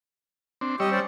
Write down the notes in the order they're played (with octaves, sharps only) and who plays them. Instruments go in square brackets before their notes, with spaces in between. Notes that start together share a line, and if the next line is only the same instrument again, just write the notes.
[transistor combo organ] C4 D4
[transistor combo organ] G3 C#5 E6 [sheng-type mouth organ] G4 D#5
[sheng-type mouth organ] C#4 C5 D5